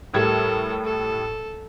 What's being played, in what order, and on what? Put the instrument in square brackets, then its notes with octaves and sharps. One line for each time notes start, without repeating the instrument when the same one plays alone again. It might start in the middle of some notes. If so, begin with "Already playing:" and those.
[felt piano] A2 G3 G#6 [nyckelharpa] A4 A#4
[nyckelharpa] A4